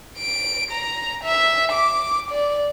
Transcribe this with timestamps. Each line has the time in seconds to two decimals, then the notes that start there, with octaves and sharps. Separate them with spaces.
0.18 D7
0.71 A#5
1.24 E5
1.72 D6
2.31 D5